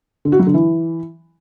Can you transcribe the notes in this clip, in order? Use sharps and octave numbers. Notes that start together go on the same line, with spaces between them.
D3
F#4
F#3
D3
E3